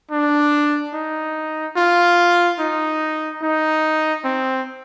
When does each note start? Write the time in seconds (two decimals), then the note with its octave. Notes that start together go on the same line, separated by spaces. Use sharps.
0.11 D4
0.94 D#4
1.77 F4
2.59 D#4
3.43 D#4
4.25 C4